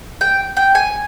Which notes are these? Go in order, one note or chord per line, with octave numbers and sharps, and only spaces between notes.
G5
G5
G#5